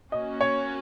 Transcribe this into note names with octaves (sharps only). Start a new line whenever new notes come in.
A#3 C#4 F#4 D#5
C#5